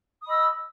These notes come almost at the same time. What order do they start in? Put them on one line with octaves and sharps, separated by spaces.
D#6 B5 D#5 E6